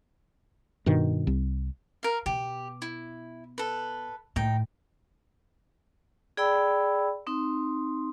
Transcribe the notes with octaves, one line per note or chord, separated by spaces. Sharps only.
G2 B2 D#3
C2
A#4 F5
B2 G4
E4
A4 B4
A2 D#3 D#4 G5
G#4 D5 G5 B5 E6
C4 D#4 C6